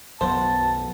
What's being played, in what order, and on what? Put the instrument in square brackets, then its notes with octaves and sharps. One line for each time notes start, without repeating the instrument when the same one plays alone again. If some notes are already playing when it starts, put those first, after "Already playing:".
[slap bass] B1 F#2 F#3 [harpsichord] B3 [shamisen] C5 [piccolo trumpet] A5